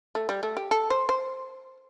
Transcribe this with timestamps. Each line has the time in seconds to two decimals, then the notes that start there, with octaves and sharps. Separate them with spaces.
0.15 A3
0.29 G3
0.43 A3
0.57 G4
0.71 A4
0.90 C5
1.09 C5